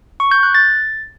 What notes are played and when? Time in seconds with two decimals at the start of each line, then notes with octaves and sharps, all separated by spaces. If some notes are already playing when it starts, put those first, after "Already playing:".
0.20 C#6
0.31 G6
0.43 F#6
0.55 A6